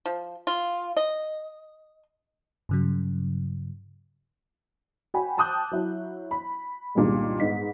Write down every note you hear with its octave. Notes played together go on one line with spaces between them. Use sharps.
F3
F4
D#5
G2 C#3 F#3
F#4 G5 G#5 B5
G5 A5 D6 D#6 F#6 G6
F#3 E4
B5
C2 G2 A#2 D#3 G3 G#3
G#2 B3 D#4 B6